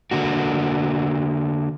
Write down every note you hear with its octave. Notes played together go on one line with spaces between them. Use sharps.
D3 A#3 F#4